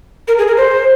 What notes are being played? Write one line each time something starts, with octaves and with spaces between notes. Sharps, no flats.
A#4
G#4
A#4
C5